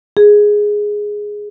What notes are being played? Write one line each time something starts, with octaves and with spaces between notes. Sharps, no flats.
G#4